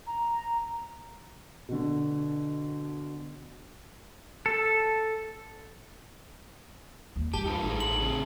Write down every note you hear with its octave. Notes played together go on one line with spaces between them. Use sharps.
A#5
B2 D3
A4
D#2
G2 G4 A5
D#4 F4 B4
A1 A3 D#4 G#4
F#7
C#3 C4 G#4